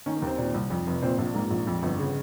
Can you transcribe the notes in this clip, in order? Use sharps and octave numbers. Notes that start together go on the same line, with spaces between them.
D#3 C#4
A#3
D#2 C4
A#2
C2
F2
F1
A#2 C4
A#1
G#2 A#3
A#1
F2
G1
C#3